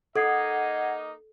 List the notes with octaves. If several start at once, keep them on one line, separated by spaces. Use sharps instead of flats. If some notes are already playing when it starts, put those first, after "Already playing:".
A#3 D#4 A4 D#5 F#5 D#6 G#6 C7